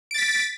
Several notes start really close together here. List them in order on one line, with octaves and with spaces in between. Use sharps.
D7 A6 B6